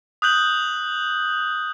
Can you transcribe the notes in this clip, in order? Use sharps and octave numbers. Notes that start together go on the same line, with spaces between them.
D#6 F#6 G6 F#7